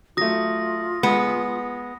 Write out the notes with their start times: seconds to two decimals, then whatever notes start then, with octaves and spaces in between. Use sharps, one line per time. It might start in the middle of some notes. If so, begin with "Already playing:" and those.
0.17 F#3 A3 F4 D#6 A#6
1.03 G#3 B3